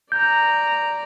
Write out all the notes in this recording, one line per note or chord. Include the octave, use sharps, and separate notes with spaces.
D5 A#5 G6